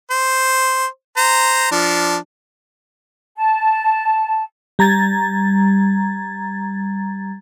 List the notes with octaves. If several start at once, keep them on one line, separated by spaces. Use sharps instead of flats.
C5
C5 A#5
F3 D4
A5
G3 A#5 G#6 A6